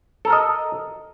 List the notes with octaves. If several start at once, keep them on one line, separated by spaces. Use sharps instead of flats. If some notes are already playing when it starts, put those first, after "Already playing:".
A4 A#4 D#5 A#5